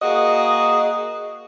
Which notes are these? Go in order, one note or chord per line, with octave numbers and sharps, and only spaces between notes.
A#3 F#4 G#4 D#5